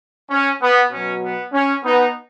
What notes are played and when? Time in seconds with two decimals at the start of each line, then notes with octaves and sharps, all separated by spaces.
0.29 C#4
0.61 B3
0.91 B2 F#3 C#4
1.22 B3
1.52 C#4
1.83 B3 D#4